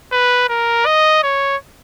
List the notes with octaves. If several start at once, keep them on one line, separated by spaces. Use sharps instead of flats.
B4
A#4
D#5
C#5